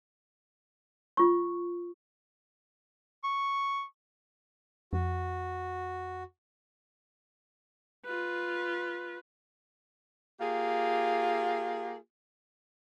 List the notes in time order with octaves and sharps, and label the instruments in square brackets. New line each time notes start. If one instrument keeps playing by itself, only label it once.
[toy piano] F4 C#6
[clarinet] C#6
[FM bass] F2 [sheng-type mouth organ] F#4
[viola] F4 B4
[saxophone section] A#3 F4 G4 G#4